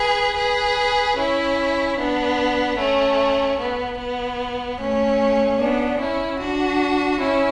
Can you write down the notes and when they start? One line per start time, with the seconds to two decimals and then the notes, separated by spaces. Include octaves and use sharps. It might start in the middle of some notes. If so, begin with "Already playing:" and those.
Already playing: G#4 B4
0.36 G#4 B4
1.16 C#4 E4
1.97 B3 D4
2.77 A3 C#4
3.58 B3
3.98 B3
4.78 A3 C#4
5.59 B3 D4
5.99 C#4 E4
6.40 D4 F#4
7.20 C#4 E4